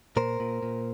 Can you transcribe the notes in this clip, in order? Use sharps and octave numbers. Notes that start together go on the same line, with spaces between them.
A#2 A#4 C5
A#2
A#2